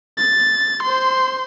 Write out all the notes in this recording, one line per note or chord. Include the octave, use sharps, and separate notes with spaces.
A6
C5 C6